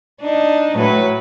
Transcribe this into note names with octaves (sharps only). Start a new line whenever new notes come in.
D4 D#4
A2 F#3 B4